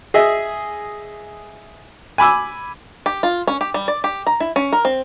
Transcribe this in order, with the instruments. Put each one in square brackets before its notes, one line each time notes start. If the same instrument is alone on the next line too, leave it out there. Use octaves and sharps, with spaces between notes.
[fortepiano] G#4 D#5 E5
G#5 B5 D6 E6
[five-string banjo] G4
F4
C#4
G4
G3
D5
G4
A#5
E4
C#4
A#4
C4